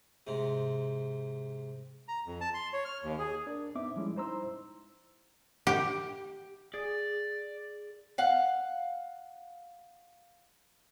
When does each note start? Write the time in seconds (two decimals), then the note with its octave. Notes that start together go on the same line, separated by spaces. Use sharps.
0.27 G#2 C3
2.08 A#5
2.27 F2
2.41 A5
2.54 C6
2.73 C#5
2.85 F6
3.03 D#2
3.19 G#4
3.47 D4 A#4 D5
3.75 B3 C4 D#4 E5 D6
3.96 F3 G3 G#3 C#4 E4
4.16 D#4 E4 C5 A#5 C6 E6
5.67 G4
6.74 G#4 D5
8.18 F5 F#5